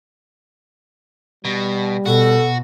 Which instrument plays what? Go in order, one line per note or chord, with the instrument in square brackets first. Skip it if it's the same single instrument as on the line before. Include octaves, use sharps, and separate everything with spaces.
[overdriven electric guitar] B2 [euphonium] G3
[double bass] B2 [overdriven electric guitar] F#4 [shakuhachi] A4